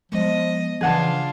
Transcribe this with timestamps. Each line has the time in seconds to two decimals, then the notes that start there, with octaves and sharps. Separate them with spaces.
0.12 F3 G#3 B3 D#5
0.81 C#3 E3 F3 D4 F4 G#4 F#5 A5